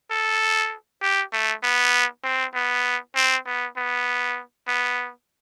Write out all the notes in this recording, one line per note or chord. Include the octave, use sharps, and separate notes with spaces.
A4
G4
A3
B3
C4
B3
C4
B3
B3
B3